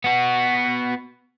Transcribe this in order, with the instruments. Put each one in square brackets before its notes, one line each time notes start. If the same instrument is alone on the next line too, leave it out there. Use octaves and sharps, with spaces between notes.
[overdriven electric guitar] B3 F#4